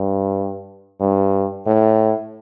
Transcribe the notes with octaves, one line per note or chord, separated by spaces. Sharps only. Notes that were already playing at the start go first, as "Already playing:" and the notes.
Already playing: G2
G2
A2